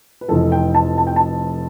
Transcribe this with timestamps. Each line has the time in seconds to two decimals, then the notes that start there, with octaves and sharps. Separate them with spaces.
0.21 B4
0.28 F1 F2 E3 A4
0.52 G5
0.75 A5
0.98 A5
1.07 G5
1.16 A5